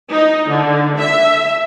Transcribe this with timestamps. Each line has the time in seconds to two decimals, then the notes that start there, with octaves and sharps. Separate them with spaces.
0.11 D#4
0.48 D3
0.99 E5